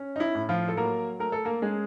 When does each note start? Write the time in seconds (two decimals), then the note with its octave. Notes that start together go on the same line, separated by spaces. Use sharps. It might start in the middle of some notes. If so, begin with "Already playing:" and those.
Already playing: C#4
0.16 D#4
0.20 E4
0.35 A2
0.49 F3 F4
0.68 A4
0.77 F#3 A#3 A#4
1.19 A3 A#4
1.32 A4
1.45 A#3 A#4
1.62 G#3 C#4 G#4